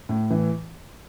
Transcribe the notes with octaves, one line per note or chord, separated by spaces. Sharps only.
A2
E3